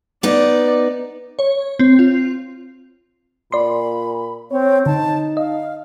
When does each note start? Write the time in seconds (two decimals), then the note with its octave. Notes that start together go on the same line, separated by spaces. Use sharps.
0.23 B3 D#4 D5
1.39 C#5
1.79 C4
1.99 F4
3.52 A#2 D5 B5 C6
4.51 C4 C#5
4.86 D3 D#4 A5
5.37 D#5 F5